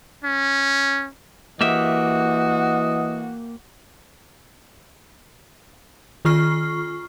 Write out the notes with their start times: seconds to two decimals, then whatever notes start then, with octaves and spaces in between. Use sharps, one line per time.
0.24 C#4
1.61 E3 A#3 F#4 G4 D#5 E5
6.25 D#3 F4 C#6 F6 C7